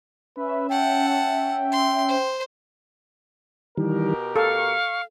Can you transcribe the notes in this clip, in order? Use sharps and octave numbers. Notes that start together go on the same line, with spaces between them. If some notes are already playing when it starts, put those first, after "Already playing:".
C#4 B4 E5
F#5 G5 A5
G5
C6
C5
B2 D#3 E3 G3 G4 A#4
A4 F5 C#6